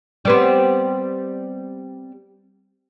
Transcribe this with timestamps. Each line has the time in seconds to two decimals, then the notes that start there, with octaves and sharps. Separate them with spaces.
0.25 G3 B3 C4